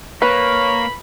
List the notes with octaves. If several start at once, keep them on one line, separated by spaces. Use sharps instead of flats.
A#3 B4 C#5 B5